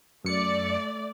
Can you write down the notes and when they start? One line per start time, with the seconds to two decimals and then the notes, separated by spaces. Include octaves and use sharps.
0.25 F#2 A3 D5 C#7